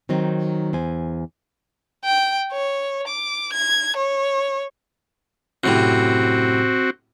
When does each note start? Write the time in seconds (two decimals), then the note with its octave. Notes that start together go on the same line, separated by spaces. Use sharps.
0.09 D#3 F#3 C4 D#4
0.73 E2 C5 G#5
2.04 G5
2.53 C#5
3.08 D6
3.53 G#6
3.96 C#5
5.64 F#2 A2 C3 C4 F#4